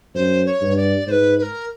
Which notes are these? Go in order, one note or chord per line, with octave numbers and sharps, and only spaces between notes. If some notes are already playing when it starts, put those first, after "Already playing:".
F#2 C5
C#5
G2
D5
G#2 B4 C5
B4
A#4